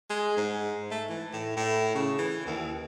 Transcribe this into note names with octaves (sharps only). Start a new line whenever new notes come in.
G#3
G#2
A3
E3
A2
A2
C#3
E3
D#2